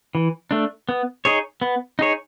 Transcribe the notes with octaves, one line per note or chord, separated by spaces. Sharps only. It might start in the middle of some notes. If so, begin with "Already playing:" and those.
E3
A3 D4
B3
D#4 G#4 C#5
B3
D#4 G#4 C#5